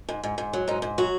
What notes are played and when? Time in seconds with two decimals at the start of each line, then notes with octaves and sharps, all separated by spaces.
0.09 G#2
0.23 G#2
0.38 G#2
0.53 F#3
0.68 G#2 D#4
0.82 G#2
0.98 F#3 F#4